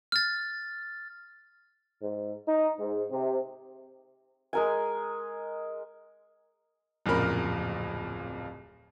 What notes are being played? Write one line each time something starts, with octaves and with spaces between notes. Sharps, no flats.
F6 A6
G#2
D#4
G#2
C3
G#3 A#4 G#5
D1 F2 A#2 C#3 A#4 B5